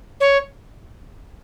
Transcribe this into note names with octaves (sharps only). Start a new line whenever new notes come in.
C#5